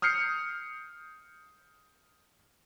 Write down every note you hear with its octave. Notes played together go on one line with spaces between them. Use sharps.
D#6 F6 G6 C7 C#7